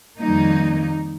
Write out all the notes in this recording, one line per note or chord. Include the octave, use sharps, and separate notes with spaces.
F2 D#3 G3 A#3 D#4